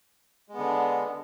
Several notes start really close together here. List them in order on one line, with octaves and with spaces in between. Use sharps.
G#3 B3 D3